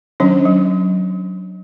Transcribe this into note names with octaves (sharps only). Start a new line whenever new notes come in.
D#3 F#3 C#4 D4 C#5
F#3